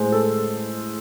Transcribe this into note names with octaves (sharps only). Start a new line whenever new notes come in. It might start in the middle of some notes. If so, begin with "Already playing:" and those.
Already playing: A2 G#3 C5
A4